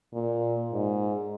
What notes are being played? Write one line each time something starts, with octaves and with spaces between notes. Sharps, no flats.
A#2
G#2